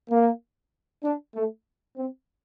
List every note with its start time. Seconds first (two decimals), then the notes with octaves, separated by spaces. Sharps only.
0.10 A#3
1.04 D4
1.35 A3
1.97 C4